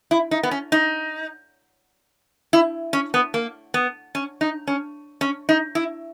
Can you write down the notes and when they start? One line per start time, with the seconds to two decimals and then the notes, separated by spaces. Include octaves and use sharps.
0.11 E4
0.31 D#4
0.43 B3
0.51 C#4
0.72 D#4
2.53 E4
2.93 C#4
3.14 B3
3.34 A#3
3.74 B3
4.15 C#4
4.41 D#4
4.67 C#4
5.21 C#4
5.49 D#4
5.75 E4